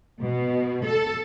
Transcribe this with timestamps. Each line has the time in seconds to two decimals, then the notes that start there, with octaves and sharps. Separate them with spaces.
0.22 B2
0.86 A4